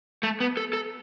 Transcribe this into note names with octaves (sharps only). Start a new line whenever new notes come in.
A3
B3
A4
A4